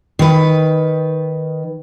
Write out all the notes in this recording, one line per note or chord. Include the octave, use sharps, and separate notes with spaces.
D#3 B4